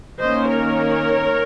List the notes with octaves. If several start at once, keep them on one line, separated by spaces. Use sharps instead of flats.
D#3 A#3 C#4 C5 D#5
A#4 C#5